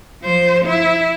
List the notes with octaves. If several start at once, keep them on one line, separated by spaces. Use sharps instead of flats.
F3 C5
E4